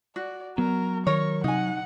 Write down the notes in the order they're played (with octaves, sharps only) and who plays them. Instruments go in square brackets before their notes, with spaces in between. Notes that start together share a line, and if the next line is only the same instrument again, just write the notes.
[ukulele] F#4 [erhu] D5
[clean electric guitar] F#3 [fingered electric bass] B3 [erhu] A#4
[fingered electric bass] D#3 [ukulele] A#4 C#5 [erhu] C#6
[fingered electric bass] C3 [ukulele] D#4 G#5 [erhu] F#5